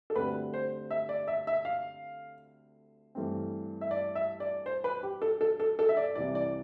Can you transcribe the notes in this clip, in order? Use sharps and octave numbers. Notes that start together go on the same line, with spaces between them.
A4
D2 D3 G3 C4 B4
C5
E5
D5
E5
E5
F5
G2 E3 A3 C4
E5
D5
E5
D5
C5
B4
G4
A4
A4
A4
A4
E5
D5
C2 C3 E3 D5
D5